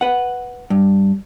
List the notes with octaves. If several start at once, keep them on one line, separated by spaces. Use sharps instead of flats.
B4 F#5
G2